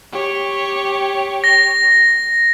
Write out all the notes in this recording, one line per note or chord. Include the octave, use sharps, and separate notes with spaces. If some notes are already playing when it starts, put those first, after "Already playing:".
G4 C#5
A#6